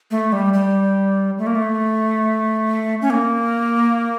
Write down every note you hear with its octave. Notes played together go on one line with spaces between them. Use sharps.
A3
G3
G3
A3
A#3
A3
C#4
A#3